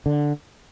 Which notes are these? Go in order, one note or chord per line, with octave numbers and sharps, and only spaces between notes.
D3